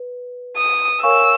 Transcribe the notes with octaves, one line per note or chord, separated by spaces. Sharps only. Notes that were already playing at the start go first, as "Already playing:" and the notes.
Already playing: B4
D#6
A#4 C#5 F5 G#5 C#6 E6